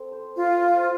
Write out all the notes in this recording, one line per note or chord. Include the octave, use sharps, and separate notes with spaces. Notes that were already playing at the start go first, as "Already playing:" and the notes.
Already playing: C4 A4
C5
F4 C5
C5